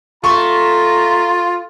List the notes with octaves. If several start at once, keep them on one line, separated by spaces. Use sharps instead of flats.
A3 F4 A#5 C#6